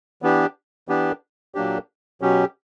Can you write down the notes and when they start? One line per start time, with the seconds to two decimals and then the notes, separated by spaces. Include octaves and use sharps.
0.22 E3 B3 D4 G4
0.88 E3 B3 D4 G4
1.55 A#2 F#3 A#3 D4 G4
2.21 B2 F#3 C#4 G4